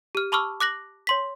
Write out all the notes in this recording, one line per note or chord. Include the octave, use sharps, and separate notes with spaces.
G4 F6
A5 B5 C#6 D6 E6 F6
D6 F#6 A#6 F#7
C#5 C6 B6